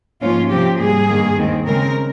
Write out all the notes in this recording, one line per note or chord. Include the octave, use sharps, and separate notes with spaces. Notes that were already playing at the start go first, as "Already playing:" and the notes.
G#2 F3 A#3 C#4 F4
C3 F3 C4 G4
G#2 G3 A#3 G#4
G2 D#3 A#3
D#2 D#3 G#3 C4
C#3 G#3 C4 A#4